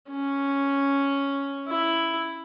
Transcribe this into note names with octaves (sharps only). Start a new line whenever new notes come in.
C#4
E4